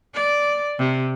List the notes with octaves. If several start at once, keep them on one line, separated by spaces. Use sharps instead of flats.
D5
C3